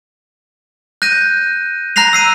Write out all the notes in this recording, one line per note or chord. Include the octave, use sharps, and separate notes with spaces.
F#6 G6 A#6 D#7
A#5 F#6 A#6 C7 F7
E6 C7 D#7